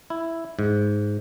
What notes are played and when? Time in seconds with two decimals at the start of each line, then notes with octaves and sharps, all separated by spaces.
0.10 E4
0.59 G#2